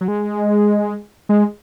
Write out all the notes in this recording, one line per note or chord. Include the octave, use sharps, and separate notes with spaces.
F#3
G#3
G#3